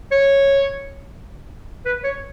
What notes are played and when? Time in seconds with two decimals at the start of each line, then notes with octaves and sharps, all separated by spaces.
0.12 C#5
1.86 B4
2.04 C#5